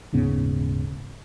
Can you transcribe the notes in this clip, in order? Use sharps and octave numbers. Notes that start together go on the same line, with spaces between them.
D#1 G#2 C#3 B3